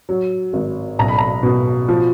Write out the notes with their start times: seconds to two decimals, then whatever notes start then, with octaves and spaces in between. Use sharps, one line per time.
0.09 F#3
0.53 G#1
0.99 B1 A#5
1.08 B5
1.18 A#5
1.43 B2
1.89 F3